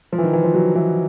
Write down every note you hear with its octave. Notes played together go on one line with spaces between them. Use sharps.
F3
E3
D#3
E3
F3
F#3
E3